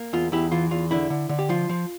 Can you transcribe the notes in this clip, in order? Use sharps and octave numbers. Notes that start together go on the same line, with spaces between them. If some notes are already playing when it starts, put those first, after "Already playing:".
Already playing: A#3
E2 F4
E2 E4 G4
E3 F4
E2 F4
D3 E4
D3
D3
G4
F3 F4
F3